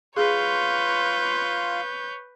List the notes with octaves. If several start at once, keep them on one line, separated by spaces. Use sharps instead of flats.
F4 G#4 B4 C#5 F5 C6 G6